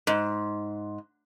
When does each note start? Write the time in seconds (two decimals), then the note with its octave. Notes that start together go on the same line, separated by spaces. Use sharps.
0.07 G#2